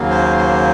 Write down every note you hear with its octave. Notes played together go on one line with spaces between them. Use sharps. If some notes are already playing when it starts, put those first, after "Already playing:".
Already playing: D#2 C#3 F#3 A#3
C5
C5